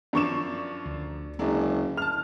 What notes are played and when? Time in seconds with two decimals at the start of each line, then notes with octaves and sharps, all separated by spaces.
0.13 F#2 F3 D4 C#6 D6 E7
0.86 D2
1.39 F#1 F#3 G#3 D4
1.97 A5 F6 F7